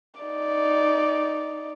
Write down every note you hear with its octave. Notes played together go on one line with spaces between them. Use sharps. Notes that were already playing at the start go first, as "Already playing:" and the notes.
D#4 D5